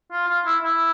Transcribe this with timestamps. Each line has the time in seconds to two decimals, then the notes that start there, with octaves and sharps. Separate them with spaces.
0.12 F4
0.28 F4
0.46 E4
0.63 E4